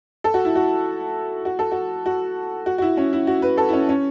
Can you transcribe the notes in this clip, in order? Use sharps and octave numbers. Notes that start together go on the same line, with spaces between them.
A4
F#4
E4
F#4
F#4
A4
F#4
F#4
F#4
F#4
E4
C#4
E4
F#4
B4
A4
E4
C#4
C#4